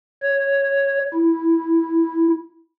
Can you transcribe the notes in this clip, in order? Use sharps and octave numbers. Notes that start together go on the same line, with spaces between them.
C#5
E4